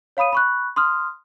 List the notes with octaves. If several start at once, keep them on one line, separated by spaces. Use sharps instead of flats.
C#5 F5 B5 D#6 D#7
B5 C#6 F#6
C6 D#6 F6